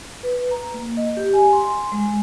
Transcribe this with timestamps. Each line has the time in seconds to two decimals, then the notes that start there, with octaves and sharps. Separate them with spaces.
0.23 B4
0.51 A#5
0.74 A#3
0.97 D#5
1.17 G4
1.33 G#5
1.53 C6
1.92 G#3